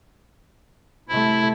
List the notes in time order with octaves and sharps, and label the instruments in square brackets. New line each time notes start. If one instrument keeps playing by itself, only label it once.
[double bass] C3 A3 [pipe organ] E4